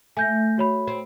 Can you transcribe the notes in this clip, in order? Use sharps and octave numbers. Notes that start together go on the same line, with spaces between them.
A3 G#5 G6 A#6
F#4 C#5 B5
C4